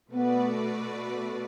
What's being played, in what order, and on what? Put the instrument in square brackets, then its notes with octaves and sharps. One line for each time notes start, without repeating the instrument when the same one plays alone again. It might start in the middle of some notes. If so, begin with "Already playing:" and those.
[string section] B2 A3 F#4 B4 D5 [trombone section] B3